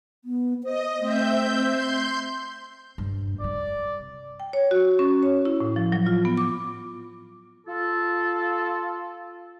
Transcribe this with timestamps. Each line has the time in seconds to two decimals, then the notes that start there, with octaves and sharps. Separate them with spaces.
0.25 B3
0.64 C5 D#5
1.00 A3 C4 E5 G6
1.70 C6 G6
2.98 G2 C3
3.41 C3 G3 D5
4.40 G5
4.53 C#5
4.71 F#4
4.99 C#4
5.23 C#5
5.45 E4
5.60 A2
5.76 F3
5.92 F#3
6.06 F4
6.25 B3
6.38 D6
7.67 F4 A4